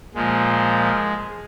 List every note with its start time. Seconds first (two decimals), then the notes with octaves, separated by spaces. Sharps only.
0.14 A#2 F3 G#3